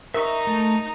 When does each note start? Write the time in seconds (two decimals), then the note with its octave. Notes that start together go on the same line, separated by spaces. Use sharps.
0.14 D#4 A#4 E5 A#5 C#6
0.47 A3